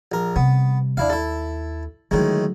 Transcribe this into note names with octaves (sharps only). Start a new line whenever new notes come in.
A#1 A#4
C3 G3 B3
D#2 D4 E4 F5
E4 A4
A2 D3 D#3 F#3 G#3